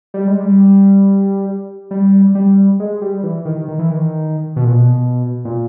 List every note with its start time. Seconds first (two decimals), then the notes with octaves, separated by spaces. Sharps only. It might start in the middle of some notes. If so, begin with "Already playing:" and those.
0.14 G3
0.27 G#3
0.40 G3
1.91 G3
2.35 G3
2.80 G#3
3.02 G3
3.23 E3
3.45 D#3
3.68 D#3
3.79 E3
3.91 D#3
4.56 B2
4.65 A#2
4.73 B2
5.45 A#2